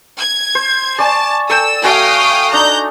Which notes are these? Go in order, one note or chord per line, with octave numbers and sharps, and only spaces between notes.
G#6
C5
D5 G#5 A5 C#6
A4 G5 E6
A3 F#4 F5 G5 G#5 D#6
D4 D#4 A#5 G6